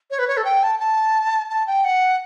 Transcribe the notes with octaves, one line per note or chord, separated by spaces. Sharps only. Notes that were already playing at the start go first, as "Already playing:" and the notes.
C#5
B4
C#5
A4
G5
A5
A5
A5
G5
F#5